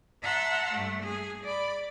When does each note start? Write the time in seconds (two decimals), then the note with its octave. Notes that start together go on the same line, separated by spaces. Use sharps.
0.21 E5 F#5 A5 A#5 C6 E6
0.72 G2 A3
1.01 G#4
1.42 D5 B5